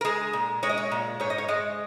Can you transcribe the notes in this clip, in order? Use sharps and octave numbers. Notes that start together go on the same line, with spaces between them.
A#4
G#3 G#4
A#2
G#3 C#5
D#5
C#5
A#2
G#2 C#5
D#5
C#5
G#3 D#5